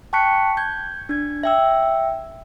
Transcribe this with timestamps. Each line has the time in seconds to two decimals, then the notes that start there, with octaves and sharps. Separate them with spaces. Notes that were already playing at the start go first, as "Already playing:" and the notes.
0.13 G5 A5 C#6 F#6 B6 C#7
0.57 G6 G#6
1.09 D4 G#6
1.43 E5 G5 E6